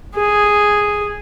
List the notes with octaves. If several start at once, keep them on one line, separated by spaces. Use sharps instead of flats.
G#4